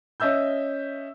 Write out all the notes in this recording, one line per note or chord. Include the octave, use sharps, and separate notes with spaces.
C#4 D#5 E5 E6 G6